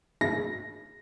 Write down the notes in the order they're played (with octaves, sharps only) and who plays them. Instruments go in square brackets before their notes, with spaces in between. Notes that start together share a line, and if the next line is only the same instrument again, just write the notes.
[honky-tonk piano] A#6